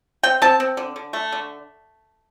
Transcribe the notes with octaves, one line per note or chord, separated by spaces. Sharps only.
C4 G5
C4 A5
C4
D3
D3
A3
D3